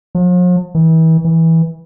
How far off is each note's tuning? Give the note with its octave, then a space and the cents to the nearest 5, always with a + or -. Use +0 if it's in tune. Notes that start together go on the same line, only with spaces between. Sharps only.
F3 +45
E3 -35
E3 -15